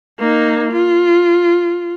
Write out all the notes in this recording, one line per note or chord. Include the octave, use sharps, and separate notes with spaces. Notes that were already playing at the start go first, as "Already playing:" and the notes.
A#3 D#4
F4